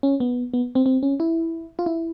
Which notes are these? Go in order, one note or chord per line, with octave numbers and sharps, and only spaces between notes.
C#4
B3
B3
C4
C4
C#4
E4
F4
E4